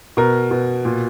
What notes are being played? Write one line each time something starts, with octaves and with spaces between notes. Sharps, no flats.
B2 A#4
B2
A#2